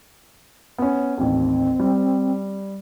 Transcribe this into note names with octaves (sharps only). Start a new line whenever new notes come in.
B3 C#4
A1 D#2 C4
G3